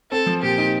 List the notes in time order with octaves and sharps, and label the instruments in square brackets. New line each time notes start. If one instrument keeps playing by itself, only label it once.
[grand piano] C4 [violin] A4
[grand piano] F3
[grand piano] A#2 [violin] G4
[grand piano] D#4